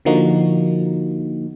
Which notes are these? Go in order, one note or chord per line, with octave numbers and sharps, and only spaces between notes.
D3 F3 A#3 D#4 F#4